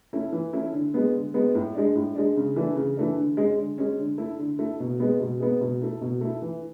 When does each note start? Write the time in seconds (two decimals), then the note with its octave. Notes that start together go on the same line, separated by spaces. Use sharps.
0.13 A3 C#4 E4
0.32 E3
0.53 A3 C#4 E4
0.73 D3
0.94 G#3 B3
1.14 D3
1.34 G#3 B3
1.55 A2
1.75 G#3 D4
1.95 A2
2.15 G#3 D4
2.36 C#3
2.56 E3 A3 D4
2.76 C#3
2.97 E3 A3 D4
3.17 D3
3.37 G#3 C#4
3.58 D3
3.78 G#3 C#4
3.98 D3
4.18 A3 E4
4.39 D3
4.59 A3 E4
4.80 B2
5.00 G#3 B3
5.20 B2
5.40 G#3 B3
5.61 B2
5.81 A3 E4
6.01 B2
6.21 A3 E4
6.42 E3